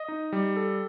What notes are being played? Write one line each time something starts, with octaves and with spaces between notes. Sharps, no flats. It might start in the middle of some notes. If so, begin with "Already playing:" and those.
Already playing: D#5
D#4
G3
A4